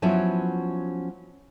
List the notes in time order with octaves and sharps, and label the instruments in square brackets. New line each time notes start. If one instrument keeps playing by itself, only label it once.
[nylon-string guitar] F3 F#3 B3 C#4 E4 F4